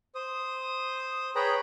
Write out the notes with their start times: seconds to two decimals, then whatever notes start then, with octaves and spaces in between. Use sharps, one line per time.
0.15 C5 D#6
1.36 G#4 B4 C#5 G5 A#5 B5